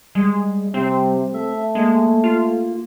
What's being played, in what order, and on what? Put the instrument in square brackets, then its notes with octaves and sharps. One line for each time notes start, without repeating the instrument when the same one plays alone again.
[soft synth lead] G3 [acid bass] G#3
[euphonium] C3 [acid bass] C4
[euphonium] A3 [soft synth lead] E5
[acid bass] G#3 [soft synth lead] A#3
[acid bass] F4